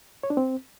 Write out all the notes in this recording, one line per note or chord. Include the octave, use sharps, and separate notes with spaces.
C#5
D4
C4